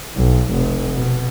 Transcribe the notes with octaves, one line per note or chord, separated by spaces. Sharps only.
B1
F1
B2